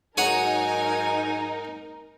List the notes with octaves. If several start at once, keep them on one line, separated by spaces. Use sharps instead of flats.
G#2 F#3 D#4 G#4 A#4 C#5 F#5 G#5